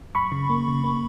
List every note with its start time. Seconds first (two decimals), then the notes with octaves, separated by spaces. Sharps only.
0.15 F#2 B5 C#6
0.32 C#3
0.49 A#3
0.68 C#3
0.84 A#3